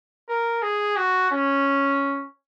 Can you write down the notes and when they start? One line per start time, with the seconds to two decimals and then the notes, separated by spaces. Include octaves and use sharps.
0.28 A#4
0.62 G#4
0.96 F#4
1.31 C#4